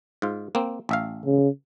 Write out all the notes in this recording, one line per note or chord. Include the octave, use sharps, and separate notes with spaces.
G#2 F4
A#3 C4
A1 E5 F5
C#3